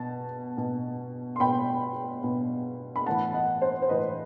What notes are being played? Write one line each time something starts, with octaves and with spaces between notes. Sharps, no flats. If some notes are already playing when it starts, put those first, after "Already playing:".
Already playing: B2 A5
B2
C6
B2 G5 B5
B2
B5
A2 E3 F#5 A5
D#5 F#5
C5
C5
A2 E3 B4 D#5